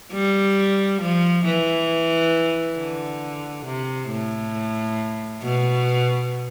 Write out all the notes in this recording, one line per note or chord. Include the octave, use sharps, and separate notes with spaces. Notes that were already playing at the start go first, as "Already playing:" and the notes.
G3
F3
E3
D3
C3
A2
B2